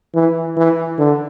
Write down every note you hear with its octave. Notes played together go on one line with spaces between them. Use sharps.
E3
E3
D3